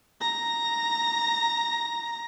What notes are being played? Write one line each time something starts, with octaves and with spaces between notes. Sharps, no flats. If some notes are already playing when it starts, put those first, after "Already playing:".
A#5 A#6